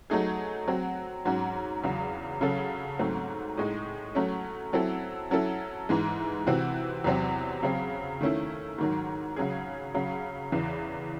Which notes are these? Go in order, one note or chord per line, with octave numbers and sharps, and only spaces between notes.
F#3 A3 D#4 G#4
F#3 C4 F#4
G#2 F#3 C#4 F#4
E2 C#3 F#3
C#3 F#3 C#4 F#4 A4
G#2 F#3 A3 C4
A2 G#3 D#4
F#3 A3 C#4
F#3 C4 E4 A4
F#3 C#4 E4 A4
G#2 E3 G#3
C3 E3 C4 F#4
E2 C3 F#3 C4
C#3 F#3 C4
D#3 A3 C#4 E4
G#2 D#3 F#3
C#3 F#3 C#4 G#4
C#3 F#3 C#4
E2 C#3 E3